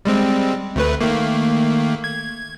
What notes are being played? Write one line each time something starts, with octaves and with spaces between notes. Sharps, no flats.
G3 G#3 C4
D2 A3 B4
D#3 A3 A#3
G#6